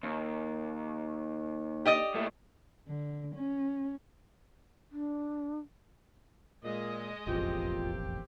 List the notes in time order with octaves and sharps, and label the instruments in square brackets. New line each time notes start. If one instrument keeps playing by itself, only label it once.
[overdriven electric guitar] D#2
[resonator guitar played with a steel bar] G4 D5 D#5
[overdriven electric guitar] A#2 A3
[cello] D3
C#4
[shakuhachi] D4
[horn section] A#2 [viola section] G#3 D#5
[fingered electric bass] E1 A1 F2 [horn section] A#3 C4 G4 [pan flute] F4